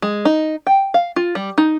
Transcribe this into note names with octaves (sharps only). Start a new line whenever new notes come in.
G#3
D#4
G5
F5
F4
G3
D#4